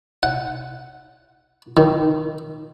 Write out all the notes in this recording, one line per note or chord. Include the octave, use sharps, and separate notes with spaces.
F#5
D#3